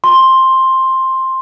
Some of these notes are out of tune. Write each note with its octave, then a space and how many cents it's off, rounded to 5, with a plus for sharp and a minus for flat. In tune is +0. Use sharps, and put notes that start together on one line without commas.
C6 +10